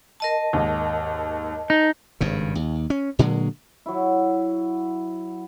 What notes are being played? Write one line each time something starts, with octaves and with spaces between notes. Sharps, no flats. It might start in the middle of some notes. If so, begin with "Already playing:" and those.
A#4 D#5 A5
D#2 G#2
D#4
G#1 G2 C#3
D#2
C#4
A#2 D3 F#3 G#3
F#3 E4